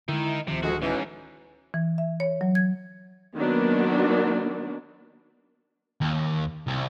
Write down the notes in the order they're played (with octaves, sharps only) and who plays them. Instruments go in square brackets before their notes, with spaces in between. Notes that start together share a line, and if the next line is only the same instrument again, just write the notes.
[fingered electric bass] D3 G#3 [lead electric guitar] D#3 D#4 [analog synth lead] E4
[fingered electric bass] D1 D#3 [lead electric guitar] C3 [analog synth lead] F3
[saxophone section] D2 G#3 [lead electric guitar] F#4
[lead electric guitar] G#2 [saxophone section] B2 E3 [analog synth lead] C#4
[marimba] E3
E5
C#5
F#3
G#6
[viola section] D#3 F#3 A#3 B3 D4
[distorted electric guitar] D#2
C2